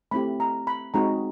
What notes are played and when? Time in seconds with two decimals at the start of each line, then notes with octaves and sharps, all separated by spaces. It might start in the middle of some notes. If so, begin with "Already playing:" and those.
0.11 A3 C4 E4 G4 B5
0.40 A#5
0.67 B5
0.94 G#3 C4 D#4 F#4 A#5